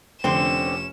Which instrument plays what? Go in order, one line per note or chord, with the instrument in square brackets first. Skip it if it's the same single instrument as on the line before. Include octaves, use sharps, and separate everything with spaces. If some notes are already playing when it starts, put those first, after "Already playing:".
[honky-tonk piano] F1 [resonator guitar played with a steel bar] D3 C4 [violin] C#4 E7